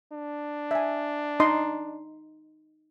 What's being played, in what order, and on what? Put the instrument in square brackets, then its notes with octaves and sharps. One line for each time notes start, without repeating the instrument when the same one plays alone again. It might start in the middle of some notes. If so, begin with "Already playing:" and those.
[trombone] D4
[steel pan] E5 G#5
D#4 D#5 C6